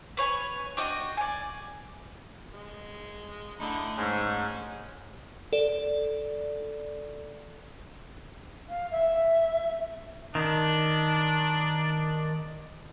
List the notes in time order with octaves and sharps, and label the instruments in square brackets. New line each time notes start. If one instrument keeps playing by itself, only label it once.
[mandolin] B4 C#5 G#5
D4 F#4 D#5 G5
D5 G#5
[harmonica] G#3
[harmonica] D3 D#4 E4 [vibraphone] A3
[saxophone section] G#2 [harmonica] C#4 G#4
[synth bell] A4 D5
[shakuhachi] F5
E5
[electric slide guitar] D#3 [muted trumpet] D4